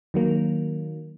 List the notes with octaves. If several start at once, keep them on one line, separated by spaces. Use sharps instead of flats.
D#3 F#3 A#3